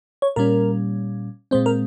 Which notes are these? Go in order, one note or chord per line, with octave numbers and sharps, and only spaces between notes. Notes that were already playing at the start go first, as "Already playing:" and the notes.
C#5
A#2 G3 C#4 A#4
A#2 G#3 C4 C5
A#4